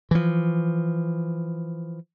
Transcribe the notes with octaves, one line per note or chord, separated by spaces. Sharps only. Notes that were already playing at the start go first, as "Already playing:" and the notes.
E3 F3